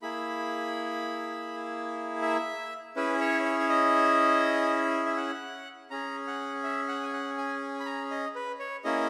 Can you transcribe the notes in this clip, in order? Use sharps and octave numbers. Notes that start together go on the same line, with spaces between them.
A#3 E4 G#4 B5
E5
C#4 E4 G#4 B4
C#5
C#5
C#5
D#5
E5
F#5
C#4 G#4 A#5
F#5
E5
F#5
G#5
F#5
G#5
B5
A#5
D#5
B4
C#5
A#3 C#4 E4 G#4 D#5